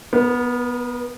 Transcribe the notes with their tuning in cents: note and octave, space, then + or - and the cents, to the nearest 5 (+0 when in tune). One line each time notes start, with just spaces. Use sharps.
B3 -10 A#4 +35